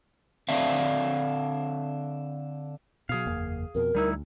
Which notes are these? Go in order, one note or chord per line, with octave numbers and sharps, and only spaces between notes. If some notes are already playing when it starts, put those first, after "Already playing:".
D3 C4 D4 E5 F5
B2 F#3 G#4 F5
F#1 E2 A#3
F2 B2 A#4
D2 G3 D#4 E4